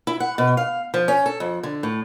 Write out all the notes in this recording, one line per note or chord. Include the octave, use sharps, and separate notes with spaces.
E4
F#5
B2
F5
F3
C#4
A4
F2
D3
A2